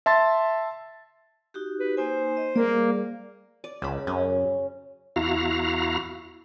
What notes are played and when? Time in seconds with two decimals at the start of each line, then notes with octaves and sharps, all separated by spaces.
0.06 E5 A5 C6 A6
1.54 D#4 F#4 G4
1.80 B4
1.97 A#3 D#4 C5 G#5
2.37 D#5
2.56 G3 A#3 G#4 D5
3.64 D5
3.82 C#2 C#3 B5
4.07 F#2 C#4
5.16 E2 E4 F#4 F5 A#5